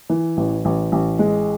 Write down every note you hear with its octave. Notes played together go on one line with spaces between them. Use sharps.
E3
A1
A1
A1
G#3